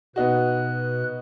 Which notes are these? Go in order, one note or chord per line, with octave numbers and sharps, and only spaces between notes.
B2 B3 D#4 F#4 B4 F#6